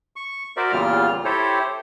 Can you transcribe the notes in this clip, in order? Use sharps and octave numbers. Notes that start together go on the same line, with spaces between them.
C#6
F#4 A#4 C5 D5 E5
E2 A#2 C#3 G3 F4 F6
E4 G4 A4 C5 C#5